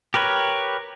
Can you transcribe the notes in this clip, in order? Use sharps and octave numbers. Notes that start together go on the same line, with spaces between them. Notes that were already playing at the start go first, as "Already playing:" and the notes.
G4 A#4 B4 C#5